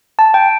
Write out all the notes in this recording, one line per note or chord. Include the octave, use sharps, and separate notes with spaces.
A5
G5